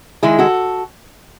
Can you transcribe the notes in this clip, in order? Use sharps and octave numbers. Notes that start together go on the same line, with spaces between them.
D#3 G#3 E4 G#4
F#4 A4